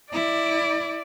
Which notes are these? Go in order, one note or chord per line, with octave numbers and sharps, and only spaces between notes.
E4 D5